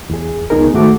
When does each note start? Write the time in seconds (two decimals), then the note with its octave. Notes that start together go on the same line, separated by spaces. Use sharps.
0.10 E2 G#4
0.50 C#2 B3 D#4 G#4 A#4
0.73 G#2 D#3 A3 F#4 D6